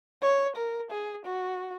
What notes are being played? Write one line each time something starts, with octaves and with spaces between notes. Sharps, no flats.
C#5
A#4
G#4
F#4